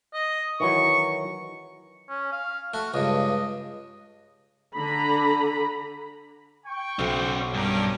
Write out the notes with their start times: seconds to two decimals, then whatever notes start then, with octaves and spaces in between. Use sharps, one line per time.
0.14 D#5
0.60 D#3 E3 F#3 C#6
2.09 C#4
2.32 F5
2.74 A3 F#4
2.94 C#2 G2 D#5
4.76 D3 A#5 B5
6.67 G5 C#6
6.99 B1 C#4 F#4 C5
7.54 G2 C#4 G4 A#4